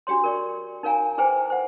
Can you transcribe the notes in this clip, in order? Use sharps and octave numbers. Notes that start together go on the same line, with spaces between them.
D4 F#4 G4 C#5 C6
A#4 D5 C#6
D#4 A#4 C#5 F5 G#5 A#5
E4 G#4 B4 C5 G5 G#5
C5 F#5